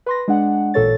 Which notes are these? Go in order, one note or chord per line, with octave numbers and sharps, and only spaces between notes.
B4 C6 A#6
G#3 D4 F#5
A1 A#2 A4 C#5 A6